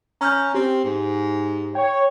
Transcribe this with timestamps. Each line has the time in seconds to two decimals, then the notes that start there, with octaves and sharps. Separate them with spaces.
0.21 C#4 A#5 F6 G6
0.54 C4 G4
0.84 G#2
1.75 C#5 G5